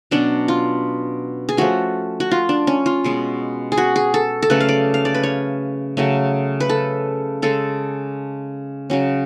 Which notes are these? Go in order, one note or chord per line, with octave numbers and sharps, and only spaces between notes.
B2 F#3 C#4 D4
F4
G#4
F3 A3 C#4 F#4
F#4
F4
D4
C#4
F4
B2 G#3 C#4
G#4
F#4
G#4
A4
A4
C#3 F#3 A3 C#4 B4
F5
D5
F5
D5
B4
C#5
C#3 F#3 A3 C#4
B4
A4
C#3 G#3 C#4 A4
C#3 F#3 C#4